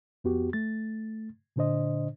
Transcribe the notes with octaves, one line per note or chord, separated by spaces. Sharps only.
F2 B3 F#4 G4
A3 A6
A#2 D3 D4 C5 D#5